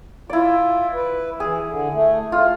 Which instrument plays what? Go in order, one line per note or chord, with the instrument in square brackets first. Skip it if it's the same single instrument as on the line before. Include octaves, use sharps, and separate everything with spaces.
[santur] E4 D5 [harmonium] F4
[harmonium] B4
[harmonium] E3 [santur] G#4
[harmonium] D3
A3
[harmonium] A3 [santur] F4